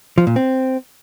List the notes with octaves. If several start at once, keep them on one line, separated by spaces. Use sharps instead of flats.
F3
A#2
C4